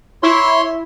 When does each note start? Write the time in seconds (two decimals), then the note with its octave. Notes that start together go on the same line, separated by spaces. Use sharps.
0.23 E4 C#5 C6